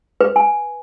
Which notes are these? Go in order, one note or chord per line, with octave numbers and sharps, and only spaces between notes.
B4
G#5